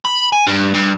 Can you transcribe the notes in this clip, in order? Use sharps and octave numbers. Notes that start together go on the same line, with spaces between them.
B5
G#5
G2
G2